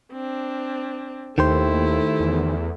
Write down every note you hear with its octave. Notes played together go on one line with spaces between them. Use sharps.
C4 D4
D#2 D#3 A3 E4 G4 C5
E2